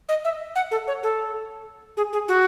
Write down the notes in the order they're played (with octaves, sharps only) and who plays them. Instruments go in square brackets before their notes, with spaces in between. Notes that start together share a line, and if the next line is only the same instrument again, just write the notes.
[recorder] D#5
E5
F#5
A4
C#5
A4
G#4
G#4
F#4